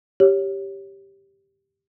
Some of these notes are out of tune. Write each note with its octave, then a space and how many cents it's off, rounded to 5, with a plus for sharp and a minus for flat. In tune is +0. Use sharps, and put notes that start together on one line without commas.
G4 +0 C#5 +0